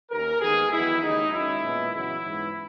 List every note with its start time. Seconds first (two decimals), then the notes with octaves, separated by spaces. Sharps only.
0.10 D#2 D#3 A#3 C#4 A#4
0.41 D#2 D#3 G#3 B3 G#4
0.71 E2 D#3 F#3 B3 E4
1.02 D#2 C#3 G#3 D#4
1.32 F#2 D#3 G#3 C#4 E4
1.62 A#2 G#3 B3
1.92 E2 C#3 F#3 C#4 E4
2.24 G#2 E3 B3